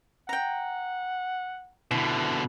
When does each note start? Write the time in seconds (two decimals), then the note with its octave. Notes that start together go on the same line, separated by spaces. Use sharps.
0.29 F#5 G5 A#5
1.91 B2 D3 E4